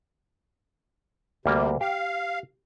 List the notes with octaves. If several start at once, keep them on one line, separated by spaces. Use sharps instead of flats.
D2 C3 G3 A#3
G4 F5